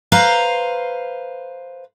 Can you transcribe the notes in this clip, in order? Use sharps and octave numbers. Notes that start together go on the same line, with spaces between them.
B4 C5 F5 A#5